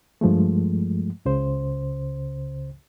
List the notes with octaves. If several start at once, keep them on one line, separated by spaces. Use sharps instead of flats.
G2 F3 G#3 A3
C#2 C#3 C5